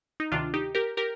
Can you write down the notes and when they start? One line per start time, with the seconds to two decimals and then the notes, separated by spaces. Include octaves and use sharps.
0.20 D#4
0.32 D2 C3 D#3 D4 F4
0.54 D#4 G4
0.75 G4 A#4
0.97 G4 A#4